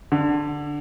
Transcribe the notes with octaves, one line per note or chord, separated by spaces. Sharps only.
D3